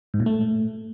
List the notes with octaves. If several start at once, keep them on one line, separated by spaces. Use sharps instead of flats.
G#2
A#2
A3